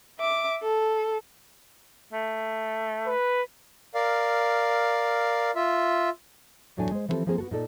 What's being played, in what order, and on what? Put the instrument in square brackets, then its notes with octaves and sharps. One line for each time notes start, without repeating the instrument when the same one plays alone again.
[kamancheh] E5 D6
A4
[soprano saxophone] A3
[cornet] B4
[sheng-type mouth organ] A#4 D5 F5
F4 E5
[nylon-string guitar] E2 A2 F#3 A3 D4 G#5
G#3 C5
E3 F3 B3 C4 G4 A4
F3 A#3 C4 G#4 A#4 C5
B3 F#4 A4
A#2 D#4 A4 D5